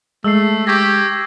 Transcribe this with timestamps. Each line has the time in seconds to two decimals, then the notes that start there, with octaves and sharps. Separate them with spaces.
0.24 G#3 A3 E6 C7
0.67 G4 C#6 G#6 A#6